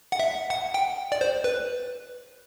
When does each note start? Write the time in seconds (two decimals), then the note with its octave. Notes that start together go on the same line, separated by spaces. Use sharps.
0.12 F#5
0.20 E5
0.50 F#5
0.74 G5
1.12 D5
1.21 C5
1.44 B4